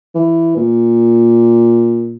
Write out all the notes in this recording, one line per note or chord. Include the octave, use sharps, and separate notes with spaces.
E3
A#2